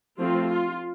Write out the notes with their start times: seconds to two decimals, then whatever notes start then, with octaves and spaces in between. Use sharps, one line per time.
0.19 F3 A3 C4 F4
0.49 F4